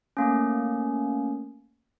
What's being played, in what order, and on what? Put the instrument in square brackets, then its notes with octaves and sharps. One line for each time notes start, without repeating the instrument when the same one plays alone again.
[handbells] A3 A#3 C#4